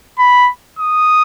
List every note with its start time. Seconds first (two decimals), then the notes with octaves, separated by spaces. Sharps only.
0.19 B5
0.79 D#6